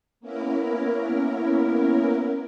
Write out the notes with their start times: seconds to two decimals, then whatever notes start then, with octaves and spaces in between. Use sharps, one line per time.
0.20 A#3 B3 C#4 E4 A#4